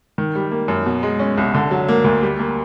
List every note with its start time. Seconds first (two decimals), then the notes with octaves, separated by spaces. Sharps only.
0.18 D#3
0.35 G3
0.52 A#3
0.68 F#2
0.86 B2
1.03 G#3
1.19 C#4
1.37 C2
1.54 D3
1.71 F#3
1.88 A#3
2.04 D2
2.22 G3
2.39 A#3